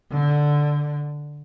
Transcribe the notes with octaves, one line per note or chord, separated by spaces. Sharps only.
D3